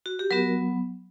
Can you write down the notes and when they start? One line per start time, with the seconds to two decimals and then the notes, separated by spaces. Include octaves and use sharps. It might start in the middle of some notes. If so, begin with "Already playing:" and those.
0.06 F#4
0.19 G4
0.31 F#3 B3 F#4 A#4